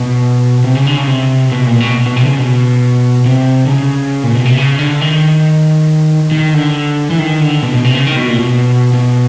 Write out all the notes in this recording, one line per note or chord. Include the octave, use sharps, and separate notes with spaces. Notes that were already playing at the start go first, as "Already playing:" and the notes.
Already playing: B2
C3
C#3
D3
C#3
C3
B2
A#2
B2
B2
C3
D3
C#3
B2
C3
D3
C#3
A#2
B2
C3
C#3
D3
D#3
D#3
D3
E3
D#3
D3
B2
B2
C3
C#3
D#3
B2
A#2
B2
B2